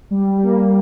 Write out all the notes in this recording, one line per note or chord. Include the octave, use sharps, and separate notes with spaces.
G3
G3
G3
A#3